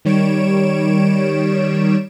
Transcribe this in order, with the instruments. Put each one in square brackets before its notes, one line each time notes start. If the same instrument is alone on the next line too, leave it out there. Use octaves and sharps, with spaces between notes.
[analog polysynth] D#3 G3 C#5 D7 E7